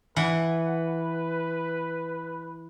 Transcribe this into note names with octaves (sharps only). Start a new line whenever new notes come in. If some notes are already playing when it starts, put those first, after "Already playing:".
E3 B4 F#5